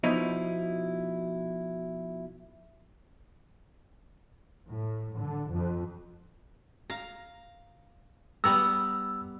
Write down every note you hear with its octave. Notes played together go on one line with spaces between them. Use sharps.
B2 F3 D#4 E4
A2
D3
F2
F5 A#5
G3 B3 A#5 E6